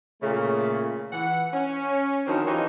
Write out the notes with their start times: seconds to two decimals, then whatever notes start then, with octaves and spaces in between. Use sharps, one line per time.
0.23 A#2 C#3 A3
1.12 E3 F#5
1.53 C#4
2.27 D#3 F3 F#3 C4 D4 D#4
2.46 E3 F3 D#4 G4 C#5